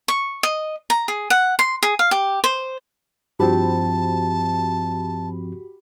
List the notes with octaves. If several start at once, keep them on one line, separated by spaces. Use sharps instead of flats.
C#6
D#5
A#5
G#4
F#5
C6
G#4
F5
G4
C5
G2 F3 C4 F#4 G4 A5 B5